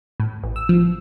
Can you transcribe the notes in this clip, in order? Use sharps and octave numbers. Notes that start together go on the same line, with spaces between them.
A2
A1
E6
F3